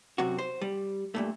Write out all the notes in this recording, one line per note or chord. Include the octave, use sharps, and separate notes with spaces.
F#2 C3 F#4
C5
G3
G2 A#2 A3